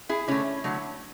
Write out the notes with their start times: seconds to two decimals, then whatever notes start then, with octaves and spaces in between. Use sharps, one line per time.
0.09 E4 G#4
0.28 D3 A3 C#4 E4
0.64 D3 F#3 A3